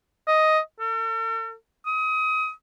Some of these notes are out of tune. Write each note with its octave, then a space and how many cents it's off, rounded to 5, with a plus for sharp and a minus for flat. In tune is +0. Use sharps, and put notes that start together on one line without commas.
D#5 +5
A4 +45
D#6 +30